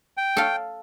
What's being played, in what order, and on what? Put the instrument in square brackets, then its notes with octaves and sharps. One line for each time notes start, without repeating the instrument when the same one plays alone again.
[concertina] G5
[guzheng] A4 F5